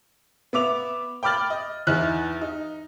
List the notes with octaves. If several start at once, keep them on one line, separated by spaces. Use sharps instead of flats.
B3 E5 D6 F7
G5 B5 D6 F6 A6 F#7
D#5
E2 D#4 E4 F6 F#6
D#4